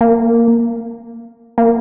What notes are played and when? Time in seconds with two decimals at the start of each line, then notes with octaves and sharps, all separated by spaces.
0.01 A#3
1.58 A#3